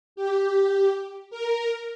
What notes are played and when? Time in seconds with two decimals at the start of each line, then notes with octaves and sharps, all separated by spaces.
0.16 G4
1.30 A#4